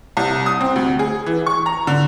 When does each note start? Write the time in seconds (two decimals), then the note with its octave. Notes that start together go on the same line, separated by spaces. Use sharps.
0.17 C2
0.46 D#6
0.61 C4
0.76 D2
0.99 G#4
1.26 E3
1.47 C#6
1.66 A#5
1.87 D3